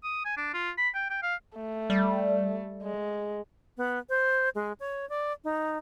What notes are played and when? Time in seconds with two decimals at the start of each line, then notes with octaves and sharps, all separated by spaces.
0.03 D#6
0.25 G#5
0.37 D4
0.54 F4
0.78 B5
0.95 G5
1.10 G5
1.23 F5
1.56 A3
1.90 G3
2.83 G#3
3.77 B3
4.09 C5
4.55 G#3
4.80 C#5
5.09 D5
5.44 D#4